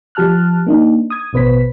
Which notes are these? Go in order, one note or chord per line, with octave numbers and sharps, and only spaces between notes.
F3 G4 A5 F6 F#6
A#3 D4 D#4
D#6 G#6
A1 B2 B4 C5 B6